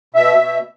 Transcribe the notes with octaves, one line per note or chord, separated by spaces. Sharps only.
B2 E5
B2